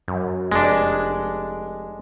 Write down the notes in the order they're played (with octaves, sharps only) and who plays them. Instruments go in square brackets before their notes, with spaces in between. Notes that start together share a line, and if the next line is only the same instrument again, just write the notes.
[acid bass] F#2
[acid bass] F1 [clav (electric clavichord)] G#3 D4